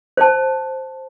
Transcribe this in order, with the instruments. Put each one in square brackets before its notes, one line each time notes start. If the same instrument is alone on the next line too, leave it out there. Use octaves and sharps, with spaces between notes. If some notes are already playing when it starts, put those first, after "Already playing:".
[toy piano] C5 A5